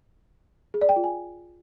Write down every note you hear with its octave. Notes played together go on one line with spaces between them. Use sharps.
G#4
D5
G5
F4
G#5